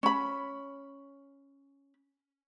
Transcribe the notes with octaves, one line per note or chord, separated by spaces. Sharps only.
C#4 B5